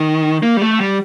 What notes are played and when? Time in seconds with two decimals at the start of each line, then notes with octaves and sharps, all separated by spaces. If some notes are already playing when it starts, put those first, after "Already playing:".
Already playing: D#3
0.43 A#3
0.57 G3
0.62 A3
0.80 G3